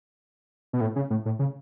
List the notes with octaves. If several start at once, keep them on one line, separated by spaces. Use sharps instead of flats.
B2
A2
C#3
A2
A2
C#3